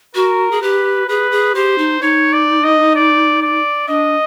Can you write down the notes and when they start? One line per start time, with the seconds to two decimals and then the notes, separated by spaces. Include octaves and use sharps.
0.15 F#4 A#4
0.51 G#4
0.62 G4 B4
1.08 G#4 B4
1.32 G#4
1.55 G4 C5
1.78 D#4
2.01 D#4 C#5
2.33 D5
2.64 D#5
2.95 D5
3.42 D5
3.88 D4 D#5